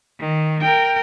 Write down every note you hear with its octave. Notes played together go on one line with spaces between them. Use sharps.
D#3
A#4 G5